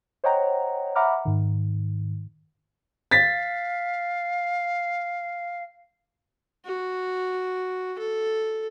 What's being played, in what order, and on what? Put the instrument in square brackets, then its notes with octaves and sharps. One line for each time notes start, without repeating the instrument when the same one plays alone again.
[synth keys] C5 C#5 D#5 F#5 G5 A#5
E5 F#5 A#5 B5 D6 F6
G#2 D#3
[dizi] F5 [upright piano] A6 B6
[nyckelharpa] F#4
A4